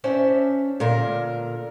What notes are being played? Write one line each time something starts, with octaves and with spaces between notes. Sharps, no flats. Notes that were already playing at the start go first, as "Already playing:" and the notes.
C#4 D4 C5 E5
A#2 D3 A#4